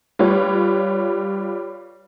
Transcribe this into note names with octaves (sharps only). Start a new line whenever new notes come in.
G3 F4 B4 C#5